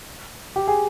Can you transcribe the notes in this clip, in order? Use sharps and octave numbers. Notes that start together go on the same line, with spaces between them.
G4
G#4